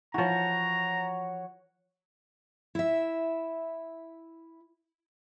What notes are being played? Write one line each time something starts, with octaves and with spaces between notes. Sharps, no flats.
E3 F3 F#4 C#5 A#5
E4 E5